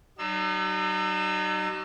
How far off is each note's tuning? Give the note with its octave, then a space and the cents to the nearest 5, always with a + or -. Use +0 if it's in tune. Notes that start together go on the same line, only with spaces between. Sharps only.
F#3 +40 D#4 -35 E6 +15